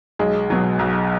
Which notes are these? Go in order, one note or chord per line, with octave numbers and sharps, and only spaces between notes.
B1 G#3
B2 F#3
B1